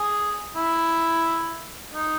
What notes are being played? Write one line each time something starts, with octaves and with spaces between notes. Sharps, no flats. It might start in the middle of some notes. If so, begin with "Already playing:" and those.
Already playing: G#4
E4
D#4